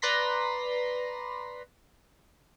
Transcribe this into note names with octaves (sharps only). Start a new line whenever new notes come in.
B4 D5 A#5 C6 A#6 B6